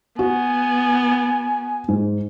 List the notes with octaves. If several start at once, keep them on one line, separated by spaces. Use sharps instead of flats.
B3 F#4 G#5
G#2